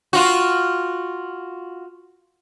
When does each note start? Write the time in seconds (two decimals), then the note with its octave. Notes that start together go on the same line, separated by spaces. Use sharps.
0.13 F4 F#4